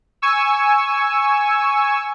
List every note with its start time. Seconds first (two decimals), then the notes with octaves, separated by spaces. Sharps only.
0.22 G#5 C#6 E6